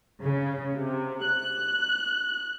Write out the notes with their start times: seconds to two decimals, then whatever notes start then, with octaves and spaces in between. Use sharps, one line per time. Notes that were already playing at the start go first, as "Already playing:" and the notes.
0.24 C#3
0.75 C3
1.24 F#6